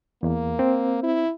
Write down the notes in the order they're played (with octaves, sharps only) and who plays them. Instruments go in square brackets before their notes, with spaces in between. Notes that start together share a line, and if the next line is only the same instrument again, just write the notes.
[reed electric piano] E2 [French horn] A#3
[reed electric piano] C4
[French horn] E4